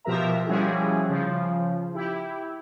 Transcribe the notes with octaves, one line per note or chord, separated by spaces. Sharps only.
B2 F3 G4 A#4 E5 A#5
F3 G3 C#4 E4 F#4 G#4
C#3 F3
E4 G4